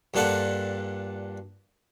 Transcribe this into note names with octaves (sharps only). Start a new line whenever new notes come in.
G2 A#2 D4 A4 F#5